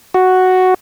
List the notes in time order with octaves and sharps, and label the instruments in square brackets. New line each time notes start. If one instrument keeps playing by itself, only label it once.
[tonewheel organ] F#4